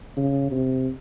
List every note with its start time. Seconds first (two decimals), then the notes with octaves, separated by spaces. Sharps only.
0.17 C#3
0.52 C3